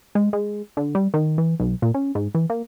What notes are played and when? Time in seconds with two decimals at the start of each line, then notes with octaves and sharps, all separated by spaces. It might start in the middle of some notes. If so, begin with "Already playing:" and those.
0.15 G#3
0.33 G#3
0.77 D3
0.95 G3
1.14 D#3
1.38 E3
1.60 B1
1.82 A#2
1.94 C#4
2.15 G#2
2.35 E3
2.50 A#3